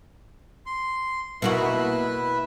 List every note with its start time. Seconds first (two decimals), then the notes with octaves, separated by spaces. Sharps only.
0.66 C6
1.42 B2 A#3 E4 F#4 B4 E5